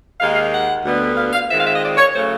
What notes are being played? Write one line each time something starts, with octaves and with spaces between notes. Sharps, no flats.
D#2 D#3 G#3 F5
F5
F#5
D2 D3 G3 B3
F5
F5
D#3 G#3 C4 F4 E5
F5
E5
D#5
D5
C#5
C#3 F#3 A3 C5